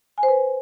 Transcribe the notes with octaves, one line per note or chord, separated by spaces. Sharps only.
G#5
C5
B4